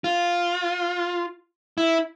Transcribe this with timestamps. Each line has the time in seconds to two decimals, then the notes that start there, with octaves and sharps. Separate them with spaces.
0.04 F4
1.78 E4